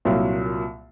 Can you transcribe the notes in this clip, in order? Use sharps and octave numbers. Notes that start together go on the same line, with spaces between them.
C2 A#2 F#3 F4